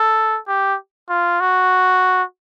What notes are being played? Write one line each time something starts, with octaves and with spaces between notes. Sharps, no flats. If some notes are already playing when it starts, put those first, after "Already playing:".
Already playing: A4
G4
F4
F#4